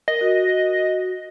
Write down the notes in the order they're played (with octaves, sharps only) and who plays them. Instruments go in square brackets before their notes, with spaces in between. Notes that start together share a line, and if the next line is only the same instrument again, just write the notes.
[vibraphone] A#4 [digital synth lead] D#5
[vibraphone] F#4